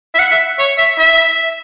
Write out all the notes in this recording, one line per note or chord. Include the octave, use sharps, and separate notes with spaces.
E5
F#5
E5
C#5
E5
E5